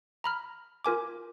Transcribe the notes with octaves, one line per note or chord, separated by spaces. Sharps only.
A#5 B5 F6
F4 A#4 G#5 D6